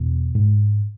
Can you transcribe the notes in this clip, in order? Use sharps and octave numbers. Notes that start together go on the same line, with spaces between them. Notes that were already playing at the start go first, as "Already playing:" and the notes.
Already playing: E2 B2
G#2